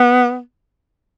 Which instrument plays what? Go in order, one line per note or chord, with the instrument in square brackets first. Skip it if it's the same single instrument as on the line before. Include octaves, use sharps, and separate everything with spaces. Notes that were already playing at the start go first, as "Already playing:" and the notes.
Already playing: [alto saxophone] B3